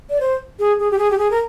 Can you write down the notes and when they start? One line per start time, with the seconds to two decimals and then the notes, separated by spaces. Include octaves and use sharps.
0.10 D5
0.20 C5
0.59 G#4
0.79 G#4
0.91 G4
0.99 G#4
1.11 G4
1.18 G#4
1.31 A#4